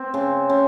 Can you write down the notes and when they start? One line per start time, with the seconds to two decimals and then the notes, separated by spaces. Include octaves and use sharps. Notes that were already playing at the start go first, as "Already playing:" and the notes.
Already playing: C4
0.14 C#3
0.50 C#3